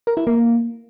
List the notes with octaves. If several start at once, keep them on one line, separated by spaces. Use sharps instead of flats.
A#4
E4
A#3